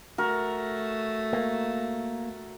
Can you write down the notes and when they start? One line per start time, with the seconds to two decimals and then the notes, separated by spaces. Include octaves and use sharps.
0.18 A3 F#4 A#4
1.33 A#3